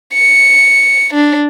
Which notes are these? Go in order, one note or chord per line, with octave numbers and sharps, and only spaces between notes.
C#7
D4